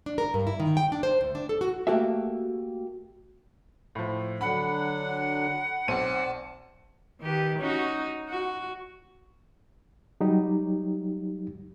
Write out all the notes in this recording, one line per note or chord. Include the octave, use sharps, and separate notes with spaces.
D4
A#4
G2
E4
D#3
G5
D4
C5
D2
D4
A4
F#4
A3 A#3 F#4 G4 A4 E5
A2 F3
D3 F#3 D4 F#5 B5
B1 C4 C5 D5 A5 D#7
D#3 G4 B4
C#4 D#4 F#4
F#4
F#3 G3 D#4 G4